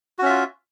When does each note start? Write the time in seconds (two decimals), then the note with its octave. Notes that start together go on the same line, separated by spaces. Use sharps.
0.18 F#4
0.22 C#4
0.26 E5
0.29 F4